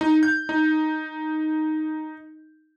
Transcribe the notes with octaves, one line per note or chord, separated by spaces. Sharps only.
D#4
G6
D#4